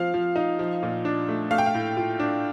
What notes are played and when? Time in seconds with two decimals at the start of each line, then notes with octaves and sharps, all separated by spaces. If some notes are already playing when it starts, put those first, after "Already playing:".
Already playing: F3 C4 F5
0.14 F3
0.36 D#4
0.59 F3
0.83 A#2
1.05 D4
1.29 A3
1.51 A3 F5
1.58 G5
1.66 F5
1.74 A2
1.97 F4
2.20 D4